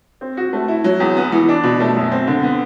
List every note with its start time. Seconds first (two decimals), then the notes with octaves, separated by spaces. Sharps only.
0.21 C4
0.37 F#4
0.53 A3
0.68 E4
0.84 F#3
1.00 E2
1.17 B3
1.32 E3
1.49 D4
1.64 B2
1.80 A3
1.96 F#2
2.12 C4
2.27 D3
2.43 B3